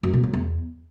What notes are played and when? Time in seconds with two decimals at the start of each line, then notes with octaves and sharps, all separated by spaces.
0.03 F#2
0.13 B2
0.23 F#3
0.33 E2